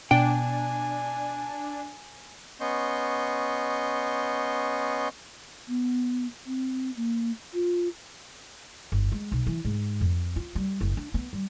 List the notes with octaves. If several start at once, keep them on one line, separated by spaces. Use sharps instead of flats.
B2 D4 G5 G#5
B3 C#4 D#5 C6 C#6 G6
B3
C4
A#3
F4
G1
G#3
B1
E3
G#2
F2
F4
G3
F#1
D4
B3
G3